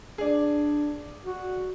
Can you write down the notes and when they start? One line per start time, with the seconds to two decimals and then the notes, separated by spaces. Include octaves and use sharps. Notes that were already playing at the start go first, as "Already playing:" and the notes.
0.18 D4 G#4 D5
1.25 F#4